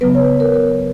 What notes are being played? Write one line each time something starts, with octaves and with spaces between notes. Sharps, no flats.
C#3 F#3 B3 B4
C#5
A#4
A#4